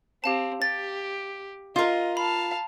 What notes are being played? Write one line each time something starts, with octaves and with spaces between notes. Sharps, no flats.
C4 G4 F5 A5
G4 A6
F4 A#4 D#5
F5 A5 B5